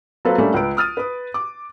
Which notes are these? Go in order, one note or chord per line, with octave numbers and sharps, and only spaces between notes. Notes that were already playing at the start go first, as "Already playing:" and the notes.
F#3 A#3 C4 F4 A4 B4
G3 A3 A#3 C#4 D4
C#2 B4 D7
D#6 F6 A6 D#7
B4 D#6
D6